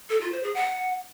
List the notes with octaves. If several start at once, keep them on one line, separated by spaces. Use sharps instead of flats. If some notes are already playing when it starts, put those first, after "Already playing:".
A4
F4
C5
G#4
F#5